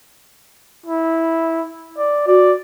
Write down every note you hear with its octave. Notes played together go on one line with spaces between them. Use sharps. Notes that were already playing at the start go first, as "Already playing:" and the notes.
E4
D5
F#4 D5